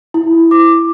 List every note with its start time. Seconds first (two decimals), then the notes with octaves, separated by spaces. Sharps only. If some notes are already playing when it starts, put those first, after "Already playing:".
0.14 E4
0.51 D6